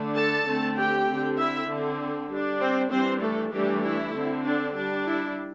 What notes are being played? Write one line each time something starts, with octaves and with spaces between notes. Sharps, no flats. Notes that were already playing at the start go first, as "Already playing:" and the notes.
Already playing: D3 A3 D4
A4 A5
D3 A3 C4
G4 G5
D3 C4
E4 E5
D3 C4
G3 D4
C4 C5
E3 G3 C4 D4 C5
A3 A4
E3 G3 A3 D4 G4
E4
D3 C4
D4
G3 D4
E4